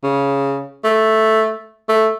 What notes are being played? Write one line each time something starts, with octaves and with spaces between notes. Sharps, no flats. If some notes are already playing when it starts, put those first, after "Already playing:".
C#3
A3
A3